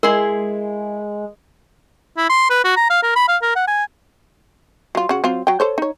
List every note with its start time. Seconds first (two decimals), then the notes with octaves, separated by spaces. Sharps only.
0.03 G#3 E4 G#4 A#4 C6
2.17 E4
2.30 C6
2.50 B4
2.64 F#4
2.76 A#5
2.90 F5
3.03 A#4
3.16 B5
3.28 F5
3.42 A#4
3.56 F#5
3.67 G#5
4.95 F#3 F4
5.09 C#3 F#4
5.24 F#3 C4 F4
5.47 F#3 G5
5.60 A4 C5 C#5
5.78 D#4 C#5